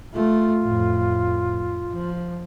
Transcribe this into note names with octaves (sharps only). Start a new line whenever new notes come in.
A3 F4
F2 A2
F3